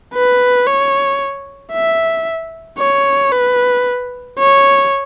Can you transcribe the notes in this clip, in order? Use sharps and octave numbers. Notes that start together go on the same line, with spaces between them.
B4
C#5
E5
C#5
B4
C#5